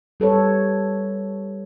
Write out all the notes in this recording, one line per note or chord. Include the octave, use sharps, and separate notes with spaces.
G3 A4 B4 C#5